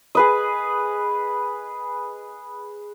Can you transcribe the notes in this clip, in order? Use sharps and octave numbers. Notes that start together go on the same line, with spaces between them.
G#4 B4 D#5